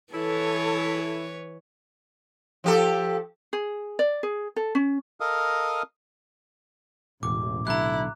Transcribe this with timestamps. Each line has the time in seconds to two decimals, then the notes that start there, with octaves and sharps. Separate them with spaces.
0.14 E3 E4 A4 B4 C#5
2.64 F3 G4 A4
3.53 G#4
3.99 D5
4.23 G#4
4.56 A4
4.75 C#4
5.20 A4 A#4 D#5 F5 D#6
7.23 E1 A1 D6
7.67 B1 D3 E4 A#5 F#6